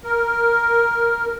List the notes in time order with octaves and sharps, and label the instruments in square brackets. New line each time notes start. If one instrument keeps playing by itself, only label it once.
[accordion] A#4